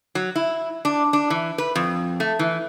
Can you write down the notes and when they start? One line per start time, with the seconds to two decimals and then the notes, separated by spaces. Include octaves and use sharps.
0.15 F#3
0.36 E4
0.85 D4
1.13 D4
1.30 E3
1.58 B4
1.75 F2
2.20 A3
2.39 E3